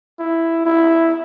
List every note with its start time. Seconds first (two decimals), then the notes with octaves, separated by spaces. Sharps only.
0.19 E4
0.65 E4